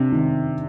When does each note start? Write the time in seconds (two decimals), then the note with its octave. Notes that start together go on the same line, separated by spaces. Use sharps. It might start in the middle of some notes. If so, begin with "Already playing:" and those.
Already playing: C3 D4
0.12 D#3